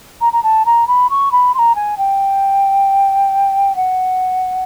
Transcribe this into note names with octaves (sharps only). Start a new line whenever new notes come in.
A#5
A#5
A5
A#5
B5
C#6
B5
C6
A#5
G#5
G5
F#5